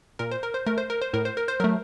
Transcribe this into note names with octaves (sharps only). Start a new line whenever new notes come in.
A#2 A#4
C5
A#4
C5
A3 A#4
C5
A#4
C5
A2 A#4
C5
A#4
C5
F#3 A3 A#4